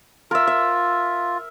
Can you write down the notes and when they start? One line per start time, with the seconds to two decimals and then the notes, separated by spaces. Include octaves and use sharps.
0.31 F4 A#4 E5
0.47 E5